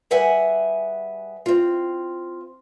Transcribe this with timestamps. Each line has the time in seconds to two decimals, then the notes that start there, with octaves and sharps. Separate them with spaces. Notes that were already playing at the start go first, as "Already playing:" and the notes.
0.11 G3 G#4 B4 E5 F#5 G#5
1.46 C4 F4